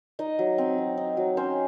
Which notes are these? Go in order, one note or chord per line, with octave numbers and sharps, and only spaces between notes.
D#4 D#5
F#3
C4
F#3
D#4
F#3
C#4 C5